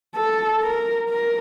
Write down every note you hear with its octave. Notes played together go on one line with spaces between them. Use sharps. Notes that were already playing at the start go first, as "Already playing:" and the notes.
A4
A#4
A#4